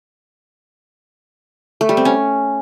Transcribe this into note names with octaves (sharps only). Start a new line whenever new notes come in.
A3
G3
C4
C#4